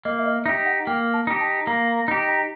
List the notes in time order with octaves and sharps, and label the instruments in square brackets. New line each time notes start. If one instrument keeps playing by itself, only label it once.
[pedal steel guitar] A#3 [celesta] D#5
[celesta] E5
D#5
[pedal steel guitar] D#4 [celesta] E5
[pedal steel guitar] G4
[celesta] F#5
[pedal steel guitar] A#3 [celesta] G5
[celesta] A5
[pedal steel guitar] D#4 G4
[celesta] A5
[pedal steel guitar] A#3 [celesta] A#5
[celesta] A#5
[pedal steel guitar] D#4 [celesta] A#5
[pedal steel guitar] G4
[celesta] A#5